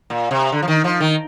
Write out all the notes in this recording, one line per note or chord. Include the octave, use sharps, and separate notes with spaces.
A#2
C3
D3
F3
D#3
F3
D#3